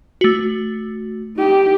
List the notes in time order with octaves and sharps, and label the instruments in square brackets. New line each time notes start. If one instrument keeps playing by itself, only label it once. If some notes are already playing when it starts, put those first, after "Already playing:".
[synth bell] A3 F#4
[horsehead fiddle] D#4 G4